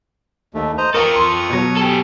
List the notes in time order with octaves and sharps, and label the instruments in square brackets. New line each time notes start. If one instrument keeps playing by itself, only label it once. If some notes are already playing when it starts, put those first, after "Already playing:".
[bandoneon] D#2 A3
C5 D#5 A#5
[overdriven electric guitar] F4 A4 [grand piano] A#4 [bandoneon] C#6 D#6
[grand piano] C6
B2 F#3
[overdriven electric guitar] G4 A4